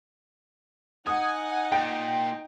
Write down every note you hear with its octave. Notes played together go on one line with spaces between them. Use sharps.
D#4 F#5 G#5 D#6
A#2 G5